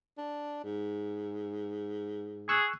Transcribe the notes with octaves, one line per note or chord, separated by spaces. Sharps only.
D4
G#2
G#4 C#6 E6 F#6